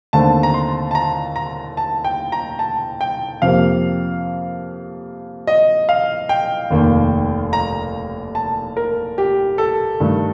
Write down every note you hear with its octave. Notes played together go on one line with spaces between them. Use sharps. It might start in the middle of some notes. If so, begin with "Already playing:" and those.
D#2 D3 A3 C4 A5
A#5
C6
A5
A#5
A#5
A5
G5
A#5
A5
G5
F2 C3 F3 A#3 F5
D#5
F5
G5
F1 D#2 D#3 A#3
A#5
A5
A#4
G4
A4
G2 D#3 A3